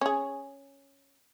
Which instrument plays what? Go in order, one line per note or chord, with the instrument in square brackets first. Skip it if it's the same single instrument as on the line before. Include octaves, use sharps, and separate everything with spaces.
[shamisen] C#4 G#4